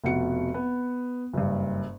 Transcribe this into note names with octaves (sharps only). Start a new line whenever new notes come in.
F1 B2 F#5 C#7
B3
F#1 G2